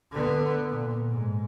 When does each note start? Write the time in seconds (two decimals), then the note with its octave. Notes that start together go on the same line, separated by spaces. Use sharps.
0.11 D3 B3
0.69 A#2
1.10 G#2